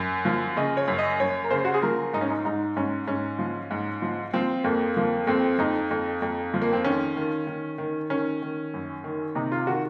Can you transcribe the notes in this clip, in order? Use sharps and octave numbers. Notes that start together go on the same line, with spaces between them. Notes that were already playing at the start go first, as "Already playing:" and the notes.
Already playing: F#2
F3
C#3 D#5
C#5
F#2
D#5
F#2 C#5
A#4
C#3 C5
F#4
G#4
F3 A#4
G#2 D#4
C#4
D#4
G#2 D#4
G#2 C#4
G#2 C#4
F3
G#2
F3
F3 C4
F2 A#3
F3 A#3
F2 C4
F2 D#4
F2
F2
F3
A#3
C4
D#3 C#4
D#3
D#3
D#3
D#3 C#4
D#3
F#2
D#3
C3 D#4
F4
D#3 F#4